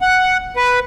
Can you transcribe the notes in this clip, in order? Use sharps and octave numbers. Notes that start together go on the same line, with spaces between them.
F#5
B4